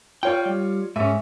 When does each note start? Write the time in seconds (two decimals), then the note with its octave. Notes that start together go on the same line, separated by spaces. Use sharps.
0.23 F4 C#5 D5 G5
0.45 G3
0.96 G#2 C#4 E5